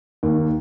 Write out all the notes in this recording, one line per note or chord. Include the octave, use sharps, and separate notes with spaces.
D#2